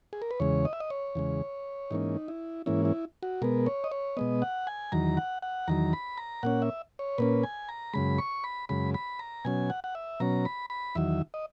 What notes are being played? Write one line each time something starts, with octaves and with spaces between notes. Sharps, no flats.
G#4
A#4
B4
E2 C#3 G#3 C#5
D#5
E5
D#5
C#5
E2 C#3 G#3
G#2 E3 A#3 C#4 D#4
E4
G#2 E3 A#3 C#4 E4
E4
F#4
B2 G#3 B3 A#4
C#5
D#5
C#5
B2 G#3 B3 D#5
F#5
G#5
E2 D#3 F#3 A#5
F#5
F#5
E2 D#3 F#3 A#5
B5
A#5
A#2 A#3 C#4 F#5
E5
C#5
A#2 A#3 C#4 B4
G#5
A#5
F#2 C#3 G#3 B5
C#6
B5
F#2 C#3 G#3 B5
B5
A#5
B2 F#3 C#4 G#5
F#5
F#5
E5
B2 F#3 C#4 A#5
B5
B5
E2 D#3 F#3 E5
D#5